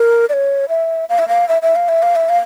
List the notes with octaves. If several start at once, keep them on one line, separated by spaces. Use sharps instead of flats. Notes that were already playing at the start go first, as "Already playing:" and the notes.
Already playing: A#4
D5
C#5
E5
F5
E5
F5
E5
E5
F5
E5
F5
E5
F5